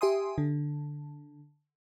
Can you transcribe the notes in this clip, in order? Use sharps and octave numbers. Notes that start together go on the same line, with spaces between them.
G4 E5 G#5 C6 D#6
D3